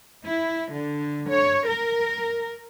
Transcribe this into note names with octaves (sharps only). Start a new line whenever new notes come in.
E4
D3
C#5
A#4